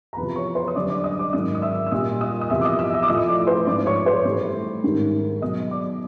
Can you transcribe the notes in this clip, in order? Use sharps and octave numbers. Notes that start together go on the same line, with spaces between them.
A#5
E2 C3 F3 B4 B5
C#5 C#6
C5 C6
D#6
F#2 D3 G3 D5 D6
D5 D6
D#5 D#6
D5 D6
G#2 D#3 F#3 D#5 D#6
D#6
E5 E6
E6
A#2 G3 D#5 D#6
D#5 D#6
D#6
E2 C3 F3 E5 E6
D6
D#5 D#6
E5 E6
D#5 D#6
D6
A2 F3 D#5 D#6
D5 D6
C5 C6
G#2 F3 D5 D6
C#5 C#6
C5 C6
A2 E3 G3
G#2 D#3 G3
B2 F#3 D#5 D#6
D5 D6